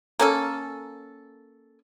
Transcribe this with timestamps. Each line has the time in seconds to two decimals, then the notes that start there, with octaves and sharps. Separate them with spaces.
0.19 A#3 C#4 A4